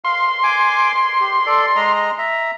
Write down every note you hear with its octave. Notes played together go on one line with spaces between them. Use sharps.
F5 C6
G#5 D6
G4
A4 D5
G#3 D#5 A#5
E5 A#5